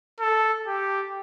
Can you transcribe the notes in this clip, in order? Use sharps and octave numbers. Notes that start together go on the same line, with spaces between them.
A4
G4